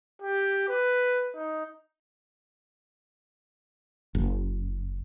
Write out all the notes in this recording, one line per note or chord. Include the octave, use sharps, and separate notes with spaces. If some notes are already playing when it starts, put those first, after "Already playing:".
G4
B4
D#4
F#1